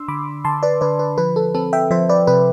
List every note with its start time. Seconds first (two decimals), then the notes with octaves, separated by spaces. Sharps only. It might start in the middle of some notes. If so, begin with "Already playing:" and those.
Already playing: D4 C6 E6
0.08 D3 B5 D6
0.45 D3 A5 C6
0.63 B4 D5
0.81 D3 B4 D5
0.99 B4
1.18 F3 B4
1.36 A4
1.55 C4 A4
1.73 E5 G5
1.91 F3 C5 E5
2.09 B4 D5
2.27 C3 B4